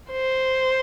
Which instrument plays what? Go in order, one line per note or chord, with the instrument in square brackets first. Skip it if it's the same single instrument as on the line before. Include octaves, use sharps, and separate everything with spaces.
[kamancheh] C5